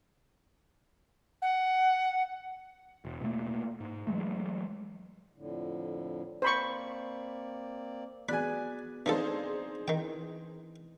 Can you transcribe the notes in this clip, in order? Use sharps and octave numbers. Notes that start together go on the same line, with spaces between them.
F#5
E1
B2 A3 A#3
G#2
E3 F#3 G#3 A3
F2 A2 D3
A#3 C4 C5 D5 B5 C#6
B3 F#4 G#4 D5 G#5 B5 F#6
E3 F3 C4 D4 D#4 G#4 A4 C5
D#3 E3 G5